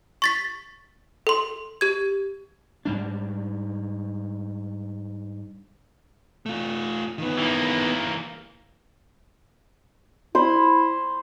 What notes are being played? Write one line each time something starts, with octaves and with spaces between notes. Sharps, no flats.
C#6 A6 B6
A4 C6
G4 G#6
G#2 G3 D4
A3 F4
D#3 B3
E3 A#3
E4 C5 B5